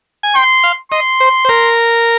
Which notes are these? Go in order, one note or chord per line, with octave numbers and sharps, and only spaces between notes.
G#5
G5 C6
F5
D#5 C6
C5
C5
A#4